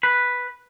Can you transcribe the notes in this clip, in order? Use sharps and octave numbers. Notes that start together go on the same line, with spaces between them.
B4